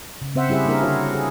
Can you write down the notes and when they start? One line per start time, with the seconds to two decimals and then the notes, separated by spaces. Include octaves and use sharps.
0.22 C#3
0.35 C#3 C4 C5 E5 F#5
0.49 G3 E4 G4 G#4 E5
0.65 G3 A#3 D4 E4 G#4 A#4
0.82 D3 E4 F#4 C#5 F5
1.15 G#4